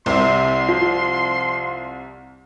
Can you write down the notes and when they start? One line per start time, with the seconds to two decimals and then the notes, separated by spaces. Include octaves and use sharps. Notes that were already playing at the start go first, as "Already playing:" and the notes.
0.06 C2 C3 C6
0.69 F3 F4